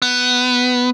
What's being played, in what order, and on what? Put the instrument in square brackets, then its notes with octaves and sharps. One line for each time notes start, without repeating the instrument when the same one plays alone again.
[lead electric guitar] B3